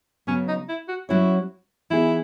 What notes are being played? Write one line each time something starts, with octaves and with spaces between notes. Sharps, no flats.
C#3 F#3 B3 C#4
D#4
E4
F#4
F#3 C#4 E4 F#4 C#5
E3 B3 D#4 E4 G#4 B4